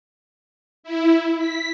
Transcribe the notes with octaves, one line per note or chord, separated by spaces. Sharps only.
E4
B6